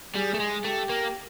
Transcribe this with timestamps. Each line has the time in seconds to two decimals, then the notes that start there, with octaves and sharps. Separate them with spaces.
0.15 G3 G#4
0.34 A3
0.40 G#3
0.65 A3 G4
0.90 A#3